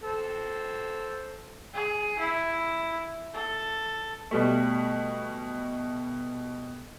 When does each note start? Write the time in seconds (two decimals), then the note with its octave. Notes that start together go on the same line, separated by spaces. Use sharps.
0.03 A4 C5
1.74 G#4
2.19 E4
3.34 A4
4.31 B2 G3 A3